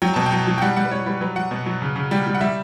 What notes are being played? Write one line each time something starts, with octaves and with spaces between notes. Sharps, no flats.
F#3 G5
B2 A5
G5
F#3
F#3
G5
G3 F#5
G3 F#5
B4
G3 C#5
G3 B4
F#3 B4
F#3 F#5
B2
F#3
C#3
C#3
G3 G5
G3
F#5
G3 E5